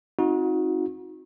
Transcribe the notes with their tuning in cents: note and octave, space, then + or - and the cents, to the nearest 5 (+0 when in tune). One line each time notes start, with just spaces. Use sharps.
C4 +35 D#4 +30 F#4 -25